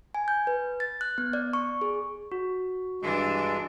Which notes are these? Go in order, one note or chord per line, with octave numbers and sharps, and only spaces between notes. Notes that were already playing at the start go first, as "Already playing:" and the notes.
G#5
G6
B4
A6
F#6
B3
D5
C#6
G#4
F#4
G2 E3 G#3 D4